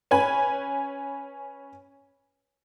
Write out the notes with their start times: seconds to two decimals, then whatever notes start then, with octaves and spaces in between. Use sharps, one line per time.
0.11 C#4 B4 G#5 B5